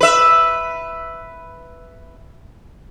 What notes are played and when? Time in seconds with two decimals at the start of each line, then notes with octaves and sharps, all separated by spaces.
0.01 B4 E5